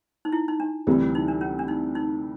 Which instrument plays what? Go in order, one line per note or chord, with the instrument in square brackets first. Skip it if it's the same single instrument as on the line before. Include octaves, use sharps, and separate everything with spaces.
[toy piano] D#4
E4
D#4
D4
[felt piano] D2 C3 E3 G3
[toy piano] D#4
D4
C#4
D4
D#4
D#4